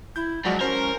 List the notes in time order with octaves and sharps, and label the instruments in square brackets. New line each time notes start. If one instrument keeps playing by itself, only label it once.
[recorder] E4 [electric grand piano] G6
[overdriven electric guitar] F#2 [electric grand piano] F3 F#4 D5 [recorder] G#3
[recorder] C#4 [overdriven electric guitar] A#4 [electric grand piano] C5